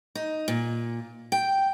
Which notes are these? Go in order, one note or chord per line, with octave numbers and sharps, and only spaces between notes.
D#4
A#2
G5